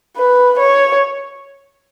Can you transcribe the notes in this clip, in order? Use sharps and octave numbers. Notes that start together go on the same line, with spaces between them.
B4
C#5